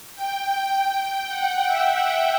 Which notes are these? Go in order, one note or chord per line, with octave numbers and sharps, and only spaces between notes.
G5
G5
F#5
E5